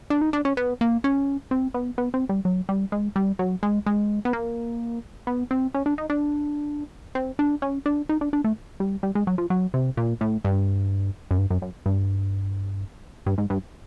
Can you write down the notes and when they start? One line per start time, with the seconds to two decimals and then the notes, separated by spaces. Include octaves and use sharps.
0.10 D4
0.22 D#4
0.33 D4
0.45 C#4
0.57 B3
0.81 A#3
1.04 C#4
1.51 C4
1.74 B3
1.98 B3
2.14 C4
2.29 G3
2.45 F#3
2.69 G3
2.92 G#3
3.16 G3
3.39 F#3
3.63 G#3
3.86 G#3
4.25 B3
4.33 A#3
5.27 B3
5.51 C4
5.74 C#4
5.86 D4
5.98 D#4
6.10 D4
7.15 C4
7.39 D4
7.62 C#4
7.86 D4
8.09 D#4
8.21 D4
8.33 D4
8.44 A3
8.80 G3
9.03 G3
9.15 G#3
9.27 F#3
9.38 F3
9.50 F#3
9.74 C3
9.97 A#2
10.21 A2
10.44 G2
11.31 F#2
11.38 G2
11.50 F#2
11.62 F#2
11.86 G2
13.26 G2
13.38 G#2
13.50 G2